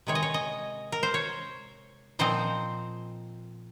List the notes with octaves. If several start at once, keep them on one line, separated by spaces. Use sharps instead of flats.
C3 D#3 G#3 C#5
D#5
C#5
D#5
A#4
C5
C#5
A#2 F3 C4 D#4 C5